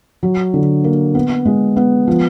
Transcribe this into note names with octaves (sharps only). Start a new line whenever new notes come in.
F#3
D3
A#3
B3
G#3
B3
F3